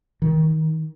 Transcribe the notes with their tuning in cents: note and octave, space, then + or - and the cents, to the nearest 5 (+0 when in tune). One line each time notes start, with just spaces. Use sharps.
D#3 +25